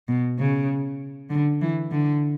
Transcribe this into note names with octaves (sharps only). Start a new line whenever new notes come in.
B2
C#3
D3
E3
D3